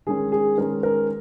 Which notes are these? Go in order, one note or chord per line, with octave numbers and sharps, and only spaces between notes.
D#3 G#3 C#4 G#4
G#4
D#3 G#3 C#4 A#4
A#4